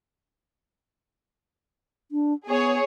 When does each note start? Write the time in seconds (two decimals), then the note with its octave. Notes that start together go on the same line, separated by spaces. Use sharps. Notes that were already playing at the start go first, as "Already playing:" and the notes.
2.12 D4
2.48 B3 G#4 C#5